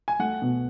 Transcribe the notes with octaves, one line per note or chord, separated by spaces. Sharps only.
G#5
A3 F#5
B2